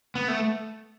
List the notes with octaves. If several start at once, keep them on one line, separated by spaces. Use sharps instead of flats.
B3
A3